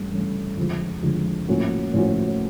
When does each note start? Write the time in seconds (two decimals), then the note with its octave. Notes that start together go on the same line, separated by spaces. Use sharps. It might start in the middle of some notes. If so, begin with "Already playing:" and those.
Already playing: G2 E3 A3 C#4
0.11 G2 E3 A3 C#4
0.57 F2 D3 F3 G#3
1.02 F2 D3 F3 G#3
1.48 A2 F3 A#3 C#4 F#4
1.94 A2 F3 A#3 C#4 F#4